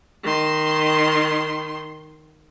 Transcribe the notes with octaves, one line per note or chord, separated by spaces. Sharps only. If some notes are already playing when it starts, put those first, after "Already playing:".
D#3 C6